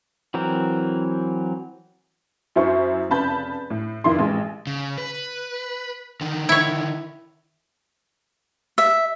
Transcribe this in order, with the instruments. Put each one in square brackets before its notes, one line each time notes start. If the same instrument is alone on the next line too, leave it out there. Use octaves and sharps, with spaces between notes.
[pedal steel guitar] E3 F#3 C4 A#4
[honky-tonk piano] F#2 E4 C5 E5 C#6
F1 C#3 B4 A5 B5 G6
A2
F1 F2 D#3 E4 F4 C6
A1 G#3
[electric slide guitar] C#3
B4
D3 D#3
[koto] E4 C#5
[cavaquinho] E5